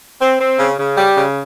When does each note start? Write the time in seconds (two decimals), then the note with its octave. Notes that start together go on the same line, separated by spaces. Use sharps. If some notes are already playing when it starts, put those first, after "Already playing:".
0.21 C4
0.40 C4
0.59 C#3
0.79 C#3
0.97 G3
1.17 C#3